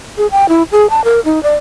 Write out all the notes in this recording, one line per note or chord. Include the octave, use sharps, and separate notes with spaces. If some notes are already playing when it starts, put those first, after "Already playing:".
G#4
G5
E4
G#4
A5
A#4
D#4
D5